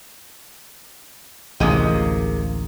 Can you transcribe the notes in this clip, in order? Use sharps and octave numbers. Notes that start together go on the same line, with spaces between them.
A1 D2 C3 G#3 A#3